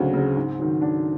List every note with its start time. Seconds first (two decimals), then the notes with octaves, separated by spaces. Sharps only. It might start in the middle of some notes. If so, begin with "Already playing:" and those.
Already playing: D2 C#3 F#3 C4
0.14 C#3 F#3
0.36 G#2
0.59 D#3 F#3
0.81 G#2 D4